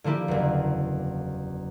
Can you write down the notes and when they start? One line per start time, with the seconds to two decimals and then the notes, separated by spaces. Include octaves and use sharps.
0.04 D3 F3 A#3 E4 G4
0.28 F#1 E2